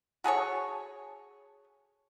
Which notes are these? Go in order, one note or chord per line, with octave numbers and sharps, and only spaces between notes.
F#4 G#4 A4 C#5